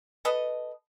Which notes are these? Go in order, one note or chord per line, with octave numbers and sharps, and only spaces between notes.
A4 B4 D#5